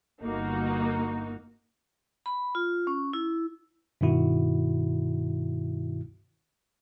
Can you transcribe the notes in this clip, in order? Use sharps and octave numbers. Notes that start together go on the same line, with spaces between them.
G1 A#3 D#4 F#4
B5
F4
C#4
E4
G2 B2 D#3 E4 F#4